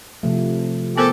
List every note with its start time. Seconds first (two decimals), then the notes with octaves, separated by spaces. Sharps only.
0.23 C3 F3 A3
0.98 B3 G4 A4 A#4 C5